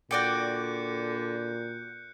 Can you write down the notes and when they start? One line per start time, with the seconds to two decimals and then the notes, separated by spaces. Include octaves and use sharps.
0.11 A#2 D3 F#4 D5 G5 F#6 G6 C#7